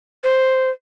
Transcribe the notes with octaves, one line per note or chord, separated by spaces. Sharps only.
C5